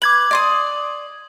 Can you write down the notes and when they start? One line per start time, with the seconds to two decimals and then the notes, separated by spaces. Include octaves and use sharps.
0.02 B4 D6 G#6 F#7
0.31 D5 C6 D#6